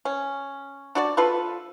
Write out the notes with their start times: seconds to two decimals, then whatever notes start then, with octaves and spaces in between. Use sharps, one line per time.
0.05 C#4
0.95 D4 F#4 D5
1.17 F3 F4 A4 B4